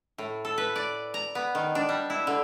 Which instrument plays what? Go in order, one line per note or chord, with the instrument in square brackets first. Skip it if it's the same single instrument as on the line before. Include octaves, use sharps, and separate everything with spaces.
[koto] A2
A4
B4
D5
A#5
B3
D#3
D4
G3
E4
D3